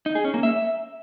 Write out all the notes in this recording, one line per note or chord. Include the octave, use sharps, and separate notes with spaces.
D#4
G#4
C#4
A#3
E5